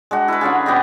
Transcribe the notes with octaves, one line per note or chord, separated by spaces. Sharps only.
G#3 D4 F#4
E4 A#4 B4
D3 C#4 F4 G#4
A#2 B3 G4 D#5